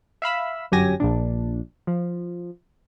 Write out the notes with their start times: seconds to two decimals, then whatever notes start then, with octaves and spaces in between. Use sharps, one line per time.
0.22 E5 F5 B5 E6
0.71 G1 F#2 F#3 G4 G#5 A#6
1.00 A#1 A#2 D4
1.87 F3